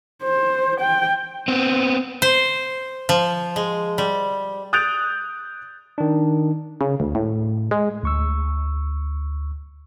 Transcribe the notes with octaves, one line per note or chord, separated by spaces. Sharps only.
C5
G5
B3 C4
C5
F3
G#3
G3
D#6 F#6 G6 A6 D7 F7
D#3 D4
C#3
D2
A2
G#3
D2 C#6 E6